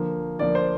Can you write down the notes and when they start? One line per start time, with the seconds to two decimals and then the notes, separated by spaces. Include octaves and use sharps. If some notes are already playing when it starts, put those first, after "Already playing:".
Already playing: D3 F3 A#3
0.39 D3 F3 A#3 D5
0.55 C5